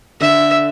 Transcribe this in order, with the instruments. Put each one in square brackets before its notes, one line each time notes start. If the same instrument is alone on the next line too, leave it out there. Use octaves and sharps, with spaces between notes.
[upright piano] D3 [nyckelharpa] E5